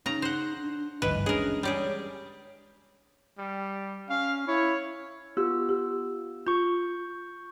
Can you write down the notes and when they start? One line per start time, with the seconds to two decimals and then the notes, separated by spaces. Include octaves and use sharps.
0.06 C#3 D#4 A#5
0.22 C5 F#5
0.58 D4
1.02 G#1 D2 G2 E3 B4 D#5
1.26 G#3 C#4 D4 G#4 A#4 D#6
1.63 G3 G4 G#4 C#5
3.38 G3
4.10 C#4 F5
4.47 E4 C#5
5.37 B3 F4 G4 E6
5.69 G4
6.47 F4 C#6 G6